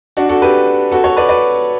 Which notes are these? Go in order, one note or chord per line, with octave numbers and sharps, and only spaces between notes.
D4 F#4
F#4 A4
G4 B4
F#4 A4
A4 C#5
B4 D5
B4 D5